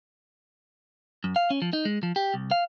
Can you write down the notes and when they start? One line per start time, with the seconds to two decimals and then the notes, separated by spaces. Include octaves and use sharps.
1.24 F#2
1.36 F5
1.50 C#4
1.62 F3
1.73 D#4
1.85 G#3
2.03 F3
2.16 G4
2.34 C2
2.51 F5